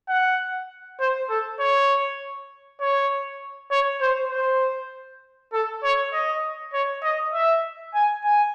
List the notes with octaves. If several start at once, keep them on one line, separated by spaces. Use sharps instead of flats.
F#5
C5
A4
C#5
C#5
C#5
C5
C5
A4
C#5
D#5
C#5
D#5
E5
G#5
G#5